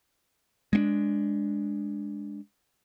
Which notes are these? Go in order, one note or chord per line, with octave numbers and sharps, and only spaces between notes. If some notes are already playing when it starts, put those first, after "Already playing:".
G#3 C4 D4